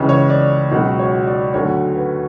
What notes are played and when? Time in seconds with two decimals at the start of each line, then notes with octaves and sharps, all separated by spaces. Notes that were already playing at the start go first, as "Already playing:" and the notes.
Already playing: C#2 C#3 E3
0.09 C#5
0.30 D5
0.71 C#2 B2 F#3
0.99 C#5
1.27 D5
1.54 D2 D3 F#3 C#5
1.96 B4